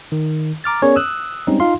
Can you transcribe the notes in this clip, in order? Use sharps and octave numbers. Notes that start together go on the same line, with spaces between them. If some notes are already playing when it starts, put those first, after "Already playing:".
D#3
A#5 D6 F6 A6
B3 C#4 G#4 A#4 C#5 D5
D#6 E6 F#6
G3 G#3 C4 C#4 D#4
D#4 F4 F5 C6